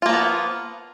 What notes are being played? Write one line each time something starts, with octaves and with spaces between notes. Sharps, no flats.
F3 A#3 B3 F4